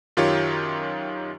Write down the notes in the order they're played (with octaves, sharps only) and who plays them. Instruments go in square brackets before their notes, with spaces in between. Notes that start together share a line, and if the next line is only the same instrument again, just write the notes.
[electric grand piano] F#2 D#3 F4 G4 C#5